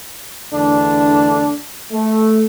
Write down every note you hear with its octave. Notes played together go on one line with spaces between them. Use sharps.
E2 D3 A3 D4
A3